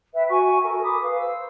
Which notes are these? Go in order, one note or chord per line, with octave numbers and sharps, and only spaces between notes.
B4 E5 G5
F#4 G#5 C#6
A4 A#4
B5 D6 D#6
B4 F5
C5 E6